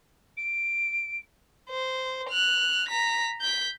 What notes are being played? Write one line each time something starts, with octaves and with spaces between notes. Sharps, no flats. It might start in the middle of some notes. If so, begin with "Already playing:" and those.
D7
C5
F6 F#6
A#5 B6
G6 B6